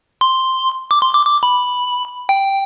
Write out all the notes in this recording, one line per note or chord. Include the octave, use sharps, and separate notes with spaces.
C6
D6
C6
D6
D6
B5
G5